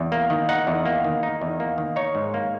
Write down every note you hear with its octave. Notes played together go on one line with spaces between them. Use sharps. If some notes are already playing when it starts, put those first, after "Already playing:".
Already playing: E2
A#3
D#3
D#4 F#5
E2
A#3
D#3
D#4
E2
A#3
D#3
D#4 C#5
G#2
A#3